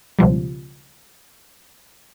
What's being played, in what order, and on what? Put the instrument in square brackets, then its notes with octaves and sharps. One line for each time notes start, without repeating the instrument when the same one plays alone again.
[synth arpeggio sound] C#2 B2 F3 G3